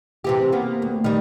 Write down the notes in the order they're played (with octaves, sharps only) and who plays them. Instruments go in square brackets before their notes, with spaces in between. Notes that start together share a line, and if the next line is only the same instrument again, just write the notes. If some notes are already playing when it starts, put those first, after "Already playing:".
[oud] C3 E3 G4
A#3 B3
D2
D#3 G3